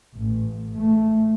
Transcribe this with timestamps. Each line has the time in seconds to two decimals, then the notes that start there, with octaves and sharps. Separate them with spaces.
0.15 A1
0.76 A3